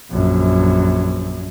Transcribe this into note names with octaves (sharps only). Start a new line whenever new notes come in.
A#1 F#2